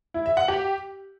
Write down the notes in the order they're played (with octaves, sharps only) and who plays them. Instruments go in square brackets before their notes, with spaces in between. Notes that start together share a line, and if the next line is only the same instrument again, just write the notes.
[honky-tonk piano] E4
E5
F#5
G4